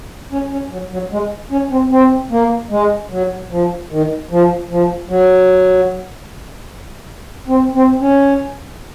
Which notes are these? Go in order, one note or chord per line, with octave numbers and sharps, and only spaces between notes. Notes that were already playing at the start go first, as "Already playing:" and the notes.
C#4
C#4
F#3
F#3
G#3
C#4
C4
C4
A#3
G#3
F#3
F3
D#3
F3
F3
F#3
C4
C4
C#4